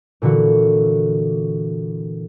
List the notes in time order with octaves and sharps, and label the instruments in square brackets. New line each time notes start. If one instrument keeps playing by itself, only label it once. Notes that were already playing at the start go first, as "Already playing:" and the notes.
[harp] A#2 D3 E3 F#4